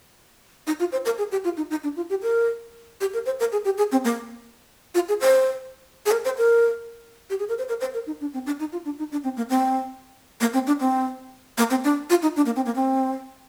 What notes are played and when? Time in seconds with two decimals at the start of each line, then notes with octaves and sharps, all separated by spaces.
0.67 D#4
0.80 F4
0.92 C5
1.05 A#4
1.18 G#4
1.32 G4
1.44 F4
1.57 D#4
1.71 D#4
1.84 D4
1.96 F4
2.10 G4
2.22 A#4
3.01 G4
3.14 A#4
3.26 C5
3.40 A#4
3.52 G#4
3.65 G4
3.78 G#4
3.92 C4
4.05 A#3
4.95 F4
5.09 G#4
5.21 C5
6.06 G#4
6.12 A#4
6.25 C5
6.38 A#4
7.30 G4
7.39 G#4
7.49 A#4
7.58 C5
7.69 A#4
7.81 C5
7.94 A#4
8.07 D#4
8.21 D4
8.34 C4
8.46 D4
8.60 D#4
8.72 F4
8.85 D4
8.99 D#4
9.12 D4
9.24 C4
9.37 A#3
9.50 C4
10.41 A#3
10.54 C4
10.67 D4
10.80 C4
11.58 A#3
11.70 C4
11.84 D4
12.10 F4
12.22 D#4
12.36 D4
12.46 A#3
12.56 C4
12.66 A#3
12.75 C4